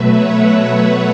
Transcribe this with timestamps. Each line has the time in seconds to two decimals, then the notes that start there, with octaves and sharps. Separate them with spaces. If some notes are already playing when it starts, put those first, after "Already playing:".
Already playing: B2 F#3 A3 B4 E5
0.11 C#5 F#5